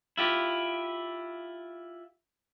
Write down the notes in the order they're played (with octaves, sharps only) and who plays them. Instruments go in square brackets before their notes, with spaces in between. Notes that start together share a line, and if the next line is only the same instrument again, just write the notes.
[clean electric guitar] E4 F4 G4